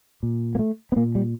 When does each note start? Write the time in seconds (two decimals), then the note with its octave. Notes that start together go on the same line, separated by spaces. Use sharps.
0.23 A#2
0.55 A#3
0.59 A3
0.92 B3
0.96 A#2 A#3
1.15 G3